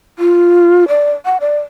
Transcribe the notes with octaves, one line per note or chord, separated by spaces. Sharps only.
F4
D5
F#5
D5